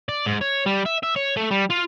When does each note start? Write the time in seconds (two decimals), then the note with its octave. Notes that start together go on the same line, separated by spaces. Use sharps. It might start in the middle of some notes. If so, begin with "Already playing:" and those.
0.09 D5
0.26 G#2
0.41 C#5
0.66 G3
0.86 E5
1.03 E5
1.16 C#5
1.37 A3
1.51 G3
1.70 F4